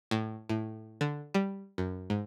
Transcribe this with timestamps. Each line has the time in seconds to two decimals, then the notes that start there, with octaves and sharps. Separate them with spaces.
0.11 A2
0.49 A2
1.01 D3
1.34 G3
1.78 F#2
2.10 G#2